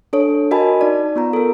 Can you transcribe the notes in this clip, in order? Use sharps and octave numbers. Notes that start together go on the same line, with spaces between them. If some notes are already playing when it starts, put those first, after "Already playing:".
D4 A4 C#5
F#4 A#4 D#5 G#5 A5 B5
D#4 D5
B3 F4 A#5
A4 A#4